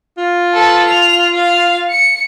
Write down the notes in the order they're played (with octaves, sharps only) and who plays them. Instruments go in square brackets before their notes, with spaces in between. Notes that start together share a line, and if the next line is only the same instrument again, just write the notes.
[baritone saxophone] F4
[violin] A4 B4
F7
F5
C#7